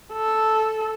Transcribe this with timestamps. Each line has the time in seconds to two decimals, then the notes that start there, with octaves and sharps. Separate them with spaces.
0.13 A4